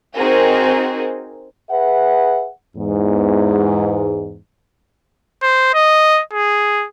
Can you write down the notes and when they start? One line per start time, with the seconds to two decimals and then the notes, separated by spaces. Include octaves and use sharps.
0.16 C4 D#4 F#4 G#4 A#4
1.71 G#4 B4 E5 F#5
2.77 E2 G#2
5.43 C5
5.74 D#5
6.33 G#4